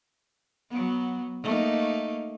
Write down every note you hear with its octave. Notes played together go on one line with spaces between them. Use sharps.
F#3 B3
A3 A#3 D#4